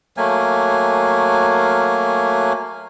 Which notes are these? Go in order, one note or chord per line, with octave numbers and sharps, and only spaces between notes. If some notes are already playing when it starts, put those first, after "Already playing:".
F#3 A3 A#3 G#5